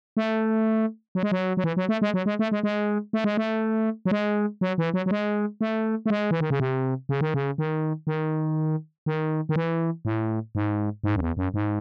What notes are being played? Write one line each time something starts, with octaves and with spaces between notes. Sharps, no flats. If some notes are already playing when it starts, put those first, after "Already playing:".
A3
F#3
G#3
F#3
F#3
E3
F#3
A3
G#3
F#3
G#3
A3
G#3
G#3
A3
G#3
A3
F#3
G#3
F#3
E3
F#3
F#3
G#3
A3
A3
G#3
E3
D#3
C#3
C3
C#3
D#3
C#3
D#3
D#3
D#3
D#3
E3
A2
G#2
G#2
F#2
E2
F#2
G#2